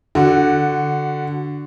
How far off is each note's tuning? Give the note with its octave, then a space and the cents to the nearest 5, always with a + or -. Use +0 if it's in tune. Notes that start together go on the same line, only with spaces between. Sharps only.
D3 +0 F#4 +5